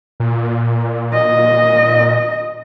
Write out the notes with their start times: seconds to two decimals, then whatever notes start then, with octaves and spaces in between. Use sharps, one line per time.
0.20 A#2
1.13 D#5